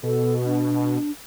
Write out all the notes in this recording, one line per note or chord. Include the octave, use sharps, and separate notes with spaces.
B2 A4
D4